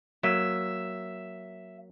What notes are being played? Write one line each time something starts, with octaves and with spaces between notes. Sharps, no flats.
F#3 A#3 E5